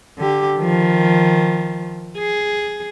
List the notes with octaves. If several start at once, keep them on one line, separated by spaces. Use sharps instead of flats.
D3 G4
D#3 F3
G#4